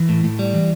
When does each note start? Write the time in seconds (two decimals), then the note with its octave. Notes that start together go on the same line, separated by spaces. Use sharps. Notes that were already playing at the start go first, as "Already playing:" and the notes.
Already playing: E3
0.09 A2
0.24 A2
0.39 G3
0.54 E3